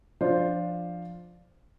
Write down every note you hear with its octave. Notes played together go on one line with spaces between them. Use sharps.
F3 D4 F4 C5